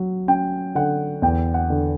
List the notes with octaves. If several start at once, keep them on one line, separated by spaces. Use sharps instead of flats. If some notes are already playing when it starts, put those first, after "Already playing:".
Already playing: F#3
C#4 G5
D3 F#5
E2 G5
F#5
D3